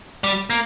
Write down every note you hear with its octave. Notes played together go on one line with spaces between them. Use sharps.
G3
A#3